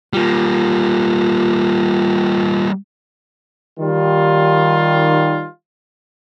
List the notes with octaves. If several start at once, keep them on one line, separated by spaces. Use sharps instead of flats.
G3 A#3 F4
D#3 G3 F4